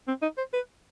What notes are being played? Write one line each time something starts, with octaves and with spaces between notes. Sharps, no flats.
C4
D#4
C5
B4